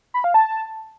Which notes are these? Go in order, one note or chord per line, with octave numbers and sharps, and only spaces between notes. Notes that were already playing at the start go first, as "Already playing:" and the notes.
B5
F5
A5